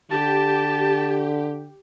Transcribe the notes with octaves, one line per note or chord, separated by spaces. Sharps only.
D3 G4 A5